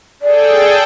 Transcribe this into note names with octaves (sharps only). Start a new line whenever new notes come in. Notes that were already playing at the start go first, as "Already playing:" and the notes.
G#4 A4 D5 G5